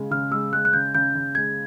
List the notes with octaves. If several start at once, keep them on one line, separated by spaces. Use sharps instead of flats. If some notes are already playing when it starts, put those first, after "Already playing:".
Already playing: C#3 G#3
C#3 F6
G#3 E6
G#3 F#6
F#6
C#3 G6
C#3 G6
C#3
G#3 G#6